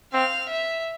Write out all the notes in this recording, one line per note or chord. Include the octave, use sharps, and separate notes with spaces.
C4 F5
E5